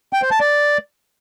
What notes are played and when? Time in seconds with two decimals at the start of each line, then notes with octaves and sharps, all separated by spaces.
0.13 G5
0.22 C5
0.31 A5
0.40 D5